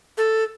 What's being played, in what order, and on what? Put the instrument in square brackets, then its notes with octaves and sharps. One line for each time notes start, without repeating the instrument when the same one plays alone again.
[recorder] A4